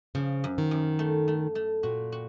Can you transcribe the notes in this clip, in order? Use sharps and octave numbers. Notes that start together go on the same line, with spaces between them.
C#3 F3
F#2
D#3
F#2
A3
A3
A3
A#2 F#4
F#4